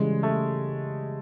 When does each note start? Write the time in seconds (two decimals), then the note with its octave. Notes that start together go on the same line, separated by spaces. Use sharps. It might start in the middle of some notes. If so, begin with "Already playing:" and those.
Already playing: C#3 E3 G3 G#3
0.23 A3